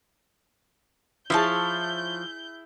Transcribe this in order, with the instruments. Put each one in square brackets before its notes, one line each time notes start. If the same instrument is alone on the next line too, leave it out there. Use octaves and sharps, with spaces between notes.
[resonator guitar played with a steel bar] F3 [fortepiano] E4 G#4 [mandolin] C5 C#5 A5 [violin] G6